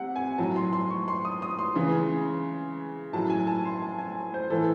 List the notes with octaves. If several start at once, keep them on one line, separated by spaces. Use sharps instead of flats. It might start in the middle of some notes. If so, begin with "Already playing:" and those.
Already playing: C3 F#5
G#5
A2 F#3 A5
C6
C6
C#6
C6
D#6
D#6
C6
C#3 E3
A2 F#3 A5
G#5
A5
C6
A5
G#5
C5
A2 E3 A4